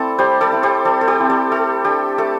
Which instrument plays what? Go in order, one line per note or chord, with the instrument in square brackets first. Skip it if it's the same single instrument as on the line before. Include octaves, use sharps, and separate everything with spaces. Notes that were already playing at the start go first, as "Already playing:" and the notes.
Already playing: [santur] A3 C4 E4 A4 D5
G3 G4 C5
A4 D5
C4 E4
G4 C5
G3 A4
A4
G4 C5
C4 E4
A4 D5
A3 A4
D4 G4
A3 A4